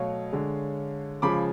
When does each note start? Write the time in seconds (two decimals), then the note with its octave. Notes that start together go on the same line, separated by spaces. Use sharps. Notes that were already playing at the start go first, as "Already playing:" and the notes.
Already playing: B2 F#3 A3 C#5 F5
0.33 D3 G#3
1.22 C#3 F3 G#3 B5 D6